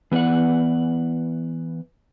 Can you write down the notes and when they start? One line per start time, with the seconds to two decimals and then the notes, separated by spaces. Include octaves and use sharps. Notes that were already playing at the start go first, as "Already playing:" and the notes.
0.11 E3 B3 C#5 D5 F#5